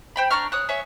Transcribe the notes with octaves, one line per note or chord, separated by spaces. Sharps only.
C5 G5 B5
D4 A#5 C#6 F6
C#5 D#6 F#6
G#4 C#5 E5